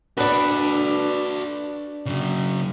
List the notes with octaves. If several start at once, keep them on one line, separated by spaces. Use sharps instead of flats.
D4 F#4 A4 B4
C#3 F#3